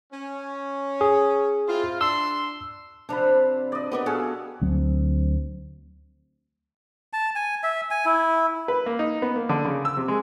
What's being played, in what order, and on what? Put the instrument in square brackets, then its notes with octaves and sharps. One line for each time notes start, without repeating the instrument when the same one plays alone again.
[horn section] C#4
[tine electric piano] G#4
[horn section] C4 E4 F4
[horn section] D4 C6 [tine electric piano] E6
[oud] C3 F3 [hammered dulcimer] D4 B5
[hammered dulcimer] D5 D#5
[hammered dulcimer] B3 G4 D5 [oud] A#4 B4 D#5
[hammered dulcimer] F#4 G#4 F5 [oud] A4
[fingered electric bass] D2 F#3 C4
[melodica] A5
G#5
E5
G#5
E4
[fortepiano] B4
A#3
D#4
B3
A#3
D3
C#3
E6
C3
G#3